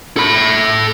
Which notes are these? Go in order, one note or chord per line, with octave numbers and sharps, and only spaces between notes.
A4 B5